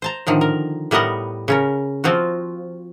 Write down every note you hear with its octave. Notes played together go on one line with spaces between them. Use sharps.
C5 A5 A#5
A2 D3 D#3 F3
A#4
A2 G3 B3 A#4 D#5 F#5
C#3 C#4 A#4
F3 C4 F4 F#4